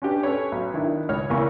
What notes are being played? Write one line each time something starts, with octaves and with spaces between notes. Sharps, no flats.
C#4 D4 G4 B4
C#4 A4 B4 C#5
B1
D#3 D4 E4
C#2 C#5 F6
E2 C#3 E3 A#3 C#6